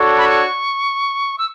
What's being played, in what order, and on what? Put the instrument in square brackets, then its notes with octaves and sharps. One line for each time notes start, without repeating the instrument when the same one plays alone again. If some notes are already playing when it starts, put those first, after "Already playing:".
Already playing: [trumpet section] D4 F#4 A4 C#5
[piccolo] B5
C#6
E6